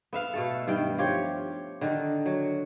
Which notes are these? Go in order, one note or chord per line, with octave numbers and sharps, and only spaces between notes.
B3 E5 F5
B2 A3 A4
G2 D#3 G5
F3 G4 C#5
D3 D#3 D#4
F#3